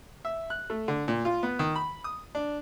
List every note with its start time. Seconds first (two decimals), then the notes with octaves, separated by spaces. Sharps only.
0.25 E5
0.50 F#6
0.70 A3
0.88 D3
1.08 A#2
1.25 F4
1.43 B3
1.59 D#3
1.76 B5
2.04 D#6
2.35 D4